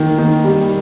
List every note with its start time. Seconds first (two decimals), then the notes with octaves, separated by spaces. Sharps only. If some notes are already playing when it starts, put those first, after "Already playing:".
Already playing: D#3 A#3
0.18 D#3
0.44 G3